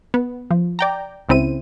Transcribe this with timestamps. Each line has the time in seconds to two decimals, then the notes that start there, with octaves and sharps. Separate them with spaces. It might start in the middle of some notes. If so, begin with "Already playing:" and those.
0.14 B3
0.51 F3
0.79 D5 G5 A#5
1.29 C#2 C#3 C4 E4 D#7